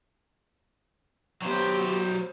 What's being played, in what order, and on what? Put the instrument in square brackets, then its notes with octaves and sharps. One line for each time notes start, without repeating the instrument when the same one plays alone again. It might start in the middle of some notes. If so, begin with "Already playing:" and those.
[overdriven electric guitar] F#3 C5 [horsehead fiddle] B3 G4